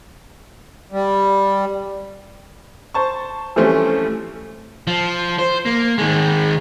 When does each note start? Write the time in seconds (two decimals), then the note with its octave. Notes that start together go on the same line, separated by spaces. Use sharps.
0.92 G3
2.94 C5 A5 C#6
3.56 E3 F3 G3 A3 C4 C#4
4.87 F3
5.38 C5
5.65 A#3
5.98 D#3 G#3